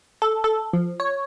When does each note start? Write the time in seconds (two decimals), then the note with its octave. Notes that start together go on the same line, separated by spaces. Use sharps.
0.22 A4
0.44 A4
0.73 F3
1.00 C#5